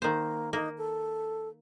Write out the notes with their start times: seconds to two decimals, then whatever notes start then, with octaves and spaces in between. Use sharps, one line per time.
0.02 D#3 A#3 C5
0.53 A#3 D#4
0.78 A4